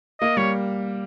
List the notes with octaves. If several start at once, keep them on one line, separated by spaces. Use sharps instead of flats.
A#3 D#5
G3 C#5